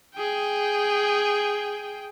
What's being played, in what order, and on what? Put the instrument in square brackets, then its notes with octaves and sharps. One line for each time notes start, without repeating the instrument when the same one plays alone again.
[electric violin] G#4 G5